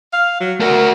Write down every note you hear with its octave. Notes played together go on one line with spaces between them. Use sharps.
F5
F#3
A3 F#4 A#4